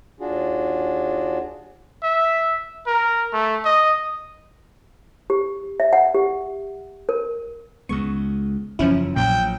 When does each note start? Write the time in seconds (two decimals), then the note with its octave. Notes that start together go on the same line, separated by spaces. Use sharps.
0.20 D#2 D4 F4 F#4 G#4
2.03 E5
2.87 A#4
3.33 A3
3.65 D#5
5.30 G4
5.80 E5
5.93 F#5
6.15 G4
7.09 A#4
7.89 C#2 G#3 B3 C#6
8.79 F#1 E2 F3 C#4 E4
9.16 A#1 A#2 F3 F#3 G5